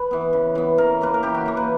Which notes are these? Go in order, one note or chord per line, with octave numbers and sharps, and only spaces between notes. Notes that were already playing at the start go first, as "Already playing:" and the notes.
Already playing: B4
E3 B3
C#3
E3 B3
C#3 A#4
E3 A#3 B4
A#4
C#3 G4
F#4
E3 A#3
B4